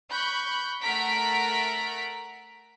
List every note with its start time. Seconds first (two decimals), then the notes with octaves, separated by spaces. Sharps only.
0.11 B5 C#6 F#6 G6
0.82 A3 A#4 F#5 A#5 B6 D7